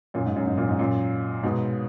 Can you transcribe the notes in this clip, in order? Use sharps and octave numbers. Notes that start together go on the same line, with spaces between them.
F#2 A#2
G#2
F#2
G#2
F#2 A#2
G#2
F#2 A#2
G#2 B2